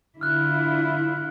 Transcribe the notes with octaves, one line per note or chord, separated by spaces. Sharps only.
D3 E4 F4 F6 F#6